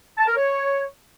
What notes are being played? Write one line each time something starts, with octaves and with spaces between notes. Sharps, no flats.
A5
A#4
C#5